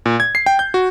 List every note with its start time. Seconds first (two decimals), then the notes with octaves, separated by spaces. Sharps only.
0.06 A#2
0.20 G#6
0.35 C7
0.46 G5
0.59 G6
0.74 F#4